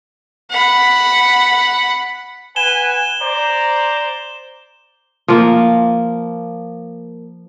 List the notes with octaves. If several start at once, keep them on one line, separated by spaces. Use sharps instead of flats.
F#5 B5
B4 F#5 G#5 E7 G7
C5 D5 A#5
F3 A#3